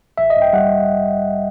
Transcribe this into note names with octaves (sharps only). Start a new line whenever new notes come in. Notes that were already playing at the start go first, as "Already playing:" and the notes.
A1 E5
D#5
G2
G5
G3 F#5